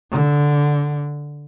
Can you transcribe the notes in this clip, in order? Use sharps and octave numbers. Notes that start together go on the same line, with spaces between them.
D3